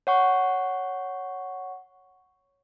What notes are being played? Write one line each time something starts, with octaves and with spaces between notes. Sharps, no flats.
C#5 F#5 C#6